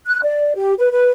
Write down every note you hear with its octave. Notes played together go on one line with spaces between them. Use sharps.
F#6
D5
G4
B4
B4